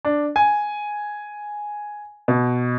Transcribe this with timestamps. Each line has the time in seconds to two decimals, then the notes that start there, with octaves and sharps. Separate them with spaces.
0.05 D4
0.36 G#5
2.28 B2